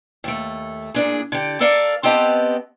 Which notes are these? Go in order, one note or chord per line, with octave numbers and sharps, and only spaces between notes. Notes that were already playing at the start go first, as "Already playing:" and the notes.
D#2 A3
A#2 D4 G#4
D3 G4
A4 A#4 D5 F5
B3 C4 G4 D#5 A5